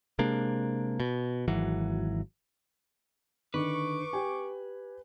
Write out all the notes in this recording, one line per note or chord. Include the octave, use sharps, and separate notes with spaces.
C3 G#3 A#3 D4
B2
G#1 E3 F#3
D3 D#3 B4 C#6 D6
G4 G5 G#5